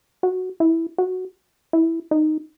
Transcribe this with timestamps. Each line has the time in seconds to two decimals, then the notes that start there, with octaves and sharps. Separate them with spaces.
0.23 F#4
0.60 E4
0.98 F#4
1.73 E4
2.11 D#4